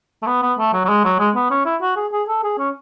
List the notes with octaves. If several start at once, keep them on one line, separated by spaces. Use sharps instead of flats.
A3
B3
B3
A3
F#3
F#3
G#3
F#3
G#3
B3
C#4
E4
F#4
G#4
G#4
A4
G#4
C#4